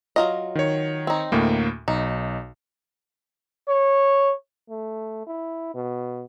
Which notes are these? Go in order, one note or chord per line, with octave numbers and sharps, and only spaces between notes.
F#3 F4 D#5
D#3 C#5
C4 D#4
D2 A2 A#3
B1 D#4
C#5
A3
E4
B2